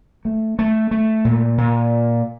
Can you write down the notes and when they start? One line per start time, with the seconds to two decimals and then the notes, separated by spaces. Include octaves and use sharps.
0.25 A3
0.59 A3
0.91 A3
1.25 A#2
1.58 A#2